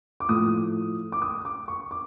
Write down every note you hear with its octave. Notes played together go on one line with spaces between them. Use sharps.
D6
A2 F3 A3 D#6
D6
D#6
D6
C#6
D6